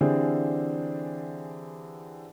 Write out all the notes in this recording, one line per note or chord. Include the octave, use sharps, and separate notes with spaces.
D3 E3 C4 D4 G4 G#4